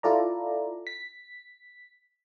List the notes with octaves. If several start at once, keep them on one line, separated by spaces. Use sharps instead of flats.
E4 F4 A4 D5 A#5
B6